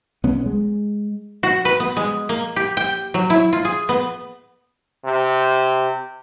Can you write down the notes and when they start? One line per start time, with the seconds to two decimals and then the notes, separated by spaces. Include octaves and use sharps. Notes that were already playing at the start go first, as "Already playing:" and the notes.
0.23 B1 B3 C#4
0.46 G#3
1.43 F#4
1.65 B4
1.80 B3
1.97 G#3
2.29 A#3
2.56 G4
2.77 G5
3.14 F#3
3.30 E4
3.53 F4
3.65 G#4
3.89 B3
5.05 C3